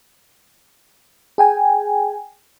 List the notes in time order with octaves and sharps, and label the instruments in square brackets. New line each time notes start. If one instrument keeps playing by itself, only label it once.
[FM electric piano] G#4 G5 G#5